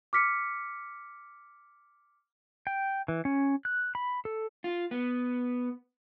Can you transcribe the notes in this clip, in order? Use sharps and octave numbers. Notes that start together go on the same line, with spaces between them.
D6 F6 B6 C#7
G5
E3
C#4
F#6
B5
A4
F4
B3